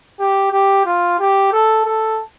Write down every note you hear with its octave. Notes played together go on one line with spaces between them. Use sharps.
G4
G4
F4
G4
A4
A4